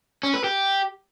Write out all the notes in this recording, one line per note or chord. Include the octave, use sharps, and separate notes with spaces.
C#4
B4
G4